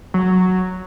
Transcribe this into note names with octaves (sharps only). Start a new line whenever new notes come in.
F#3